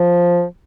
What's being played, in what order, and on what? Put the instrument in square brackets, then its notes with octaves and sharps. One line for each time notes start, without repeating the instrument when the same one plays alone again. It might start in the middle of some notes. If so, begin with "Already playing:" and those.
Already playing: [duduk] F3